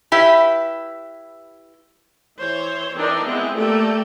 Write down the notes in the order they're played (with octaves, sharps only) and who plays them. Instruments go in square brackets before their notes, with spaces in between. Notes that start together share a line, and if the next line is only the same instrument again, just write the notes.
[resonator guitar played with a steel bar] E4 G4 B4 E5
[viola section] E3 C5 C#5
E3 C4 D4 D#4 A#4 D#5
G#3 B3 C4 E4
A3 A#3 G4 A4 D5 G5